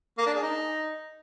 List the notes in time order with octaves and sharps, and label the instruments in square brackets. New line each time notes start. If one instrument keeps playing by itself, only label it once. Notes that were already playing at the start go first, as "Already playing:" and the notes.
[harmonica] A#3
D4
G#4
D#4